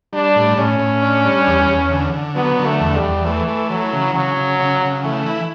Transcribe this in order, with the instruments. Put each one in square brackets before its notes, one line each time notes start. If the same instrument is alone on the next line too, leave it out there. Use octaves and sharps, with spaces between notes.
[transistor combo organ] G3 [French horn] D4
[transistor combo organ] A2
[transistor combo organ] A2 [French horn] C#4
[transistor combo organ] A2
D4
G3
E2
E2
D3
D3
[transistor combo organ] F#3 [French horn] B3
[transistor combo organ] D3
[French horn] A3
[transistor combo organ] E2
[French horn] G3
[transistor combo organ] E2
[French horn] E3 [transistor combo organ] A3
[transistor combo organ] A3
[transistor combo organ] E3 [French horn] F#3
[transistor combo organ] C#3
[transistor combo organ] C#3 [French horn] F#3
[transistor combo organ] C#3
C#3
C#3
[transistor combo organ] E3 [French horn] A3
[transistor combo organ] E4